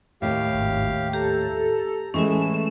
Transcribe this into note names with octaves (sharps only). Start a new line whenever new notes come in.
D#2 A2 G4 F5
G#1
G4 A4 A#5
A2 E3 G#3 A3 C#4 E5 G#5 E7